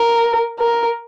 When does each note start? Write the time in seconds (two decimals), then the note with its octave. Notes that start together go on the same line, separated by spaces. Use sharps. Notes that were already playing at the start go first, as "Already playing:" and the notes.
Already playing: A#4
0.59 A#4